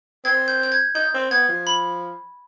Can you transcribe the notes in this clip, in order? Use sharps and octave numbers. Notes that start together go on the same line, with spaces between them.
C4 G#6
G6
G6
G#6
D#4 G6
C4
B3 G#6
F3
B5